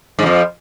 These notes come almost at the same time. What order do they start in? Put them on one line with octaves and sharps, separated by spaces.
G#2 F3 F2